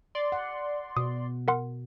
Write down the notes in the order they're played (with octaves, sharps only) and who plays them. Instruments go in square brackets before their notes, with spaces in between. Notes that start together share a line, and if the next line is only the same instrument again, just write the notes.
[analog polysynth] D5 C6
[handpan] F#5
[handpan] B2 [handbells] D#6
[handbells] A#4 F#5 C6